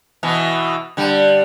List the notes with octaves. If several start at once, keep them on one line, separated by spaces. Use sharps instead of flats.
B2 E3
D3 G3